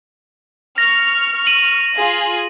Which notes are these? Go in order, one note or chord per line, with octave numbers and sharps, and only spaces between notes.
C#6 F6 A#6
D#7 F#7
F4 G#4